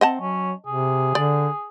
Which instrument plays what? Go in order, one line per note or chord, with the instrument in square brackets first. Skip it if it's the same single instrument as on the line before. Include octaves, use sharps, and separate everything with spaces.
[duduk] C4 [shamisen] D#5 F#5 A5
[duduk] F#3 [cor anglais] C#4
[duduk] C3 [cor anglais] G#4
[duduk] D3 [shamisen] D5